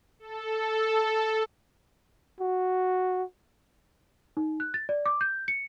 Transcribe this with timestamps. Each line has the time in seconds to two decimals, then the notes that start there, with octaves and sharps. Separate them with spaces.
0.19 A4
2.40 F#4
4.37 D#4
4.60 F#6
4.74 A6
4.89 D5
5.06 D6
5.21 G6
5.48 C#7